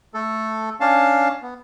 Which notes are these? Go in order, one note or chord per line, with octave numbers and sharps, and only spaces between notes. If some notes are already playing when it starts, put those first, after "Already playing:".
A3 A4
C#4 D4 F5 A5
B3